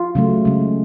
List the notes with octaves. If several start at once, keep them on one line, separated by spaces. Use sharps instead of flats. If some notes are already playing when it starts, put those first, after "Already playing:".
Already playing: F4
C#3 F#3 A3
C#3 G#3